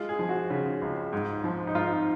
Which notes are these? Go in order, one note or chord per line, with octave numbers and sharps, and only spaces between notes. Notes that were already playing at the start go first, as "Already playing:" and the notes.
Already playing: G#3 F4
G#4
F3
F#4
C#3
C#2
G#2
F3
D#4
G#2 F4